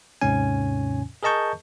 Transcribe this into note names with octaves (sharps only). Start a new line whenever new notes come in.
D#2 G#2 C3 C#4 G#5
G#4 A#4 D#5 A5 C#6 G6